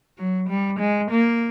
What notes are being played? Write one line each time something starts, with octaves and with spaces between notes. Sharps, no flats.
F#3
G3
G#3
A#3